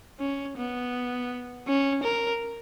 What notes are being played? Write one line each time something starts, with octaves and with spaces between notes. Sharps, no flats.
C#4
B3
C#4
A#4